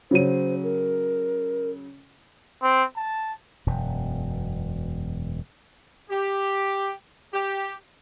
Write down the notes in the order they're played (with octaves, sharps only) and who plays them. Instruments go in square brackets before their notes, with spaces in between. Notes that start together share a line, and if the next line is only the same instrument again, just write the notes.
[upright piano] C#3 F#3 D#7 [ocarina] C5
[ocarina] A#4
[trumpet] C4
A5
[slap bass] E1 F#2 B2
[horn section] G4
G4